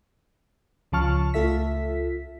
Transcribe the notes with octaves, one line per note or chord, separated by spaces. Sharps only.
C#2 C#3 F3 A5 C#6 F6
C#2 A3 F4 A4 E5 B6